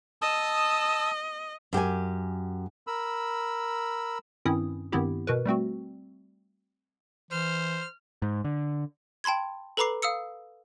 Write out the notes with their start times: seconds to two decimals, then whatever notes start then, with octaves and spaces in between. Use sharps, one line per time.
0.22 D#5 A5 D#6 E6
1.73 F#2 G4 A#4 G#5
2.87 A#4 B5 E6
4.45 G2 D#3 C4 C#4 E4 D#6
4.92 G2 D#3 B3 C4 E4 G4
5.27 B2 F#4 A#4 B4
5.46 G3 A3 C4 F#4
7.31 E3 C5 F6
8.22 G#2
8.44 D3
9.24 G5 A5 B5 C6 G#6
9.77 A4 B4 A#5 B5 D6 C7
10.02 F5 D#6 E6 C#7